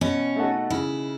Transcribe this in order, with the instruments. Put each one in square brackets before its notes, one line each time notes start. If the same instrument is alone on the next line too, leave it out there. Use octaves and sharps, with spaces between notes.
[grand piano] B2 [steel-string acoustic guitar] C#4
[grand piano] A3 D#4 F#4 A4
[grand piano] C#3 [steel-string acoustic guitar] E4